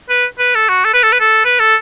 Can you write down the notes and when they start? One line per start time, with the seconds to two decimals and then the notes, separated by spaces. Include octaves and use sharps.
0.09 B4
0.39 B4
0.55 A4
0.69 F#4
0.85 A4
0.94 B4
1.03 A4
1.12 B4
1.20 A4
1.45 B4
1.59 A4